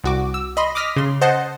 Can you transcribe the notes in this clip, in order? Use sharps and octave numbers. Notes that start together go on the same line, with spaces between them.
C2 F#4 D6
E6
D#5 B5 C6
D6 D#6 F6 A#6 B6
C#3 C6
C5 D#5 F#5 A5 C6